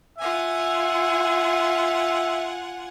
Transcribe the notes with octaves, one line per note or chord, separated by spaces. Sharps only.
F4 E5 F#5 G#5